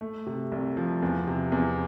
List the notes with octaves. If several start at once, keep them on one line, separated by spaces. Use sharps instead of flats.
A3
C3
C2
F3
E2
C3
E2